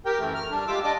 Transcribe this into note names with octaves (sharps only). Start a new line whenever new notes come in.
G4 A#4 G5
F#2 E3 A3
F6
G3 D4
G#3 F4 G4 D6 E6
D4 D5 D#5 D6